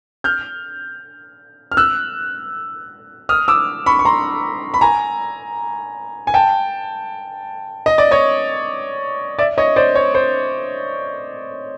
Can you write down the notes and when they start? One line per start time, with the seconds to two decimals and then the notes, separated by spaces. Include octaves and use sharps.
0.24 F6 G6
1.72 F6
1.77 E6 F#6
3.29 D#6 F6
3.48 D6 E6
3.86 B5 C#6
3.99 C#6
4.05 A#5 C6
4.74 B5
4.81 G#5 A#5
6.27 G#5
6.34 G5 A5
7.86 D#5
7.98 D5
8.11 C#5 D#5
9.39 D5 E5
9.58 C#5 D#5
9.76 C5 D5
9.95 C#5
10.15 C5